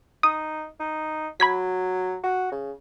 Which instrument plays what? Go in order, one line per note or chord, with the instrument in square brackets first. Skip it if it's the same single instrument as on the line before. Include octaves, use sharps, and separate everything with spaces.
[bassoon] D#4 [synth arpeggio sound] D#6
[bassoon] D#4
[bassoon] F#3 [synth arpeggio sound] B5 G#6 B6
[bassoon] F#4
C#3